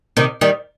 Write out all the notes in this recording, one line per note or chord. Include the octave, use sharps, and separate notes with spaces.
C3 D#3
D#3 G3